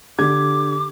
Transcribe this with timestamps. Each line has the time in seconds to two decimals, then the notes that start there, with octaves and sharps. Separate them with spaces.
0.19 D3 G4 D6 G#6